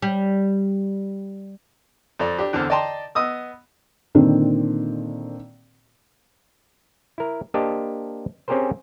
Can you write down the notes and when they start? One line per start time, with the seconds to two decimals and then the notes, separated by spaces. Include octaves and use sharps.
0.02 G3
2.19 F2 A4 D5
2.39 D4 G4
2.53 E2 D3 C4 A4 F6
2.70 D5 D#5 G5 A5 A#5 C6
3.15 B3 D#5 D#6 E6
4.15 A#2 D3 D#3 C4
7.18 E4 A#4
7.54 A#3 D4 G4 C5 D#5 A5
8.48 C4 C#4 G4 G#4 A#4 C5